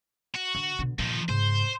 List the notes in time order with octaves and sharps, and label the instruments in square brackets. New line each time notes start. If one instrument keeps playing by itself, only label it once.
[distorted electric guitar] F#4
[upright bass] D3
B2 D3
[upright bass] A#2 D#3 [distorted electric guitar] F3 D#4
[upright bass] G#2 C#3 [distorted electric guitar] C5